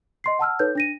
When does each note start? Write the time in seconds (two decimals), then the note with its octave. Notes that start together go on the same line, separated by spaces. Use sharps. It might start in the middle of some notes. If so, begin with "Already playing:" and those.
0.24 D#5 C6 C7
0.39 F#5 A5 E6 F6
0.59 D#4 A4 B4 C#5 G6
0.75 D4 A#6 D#7